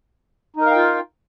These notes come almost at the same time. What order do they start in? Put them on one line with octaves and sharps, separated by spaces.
D#4 A#4 F5 G5 F4